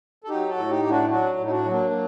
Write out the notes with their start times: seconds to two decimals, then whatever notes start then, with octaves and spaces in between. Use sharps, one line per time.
0.24 A4
0.29 F#3 D#4 G4
0.49 F#4 A4
0.56 A2
0.69 D#4 G4
0.83 A2 G4
0.90 D4 F#4
1.10 F#3 D4 F#4
1.37 A2
1.45 D#4
1.51 D4 F#4
1.65 F#3
1.71 A#3 D4
1.91 F#3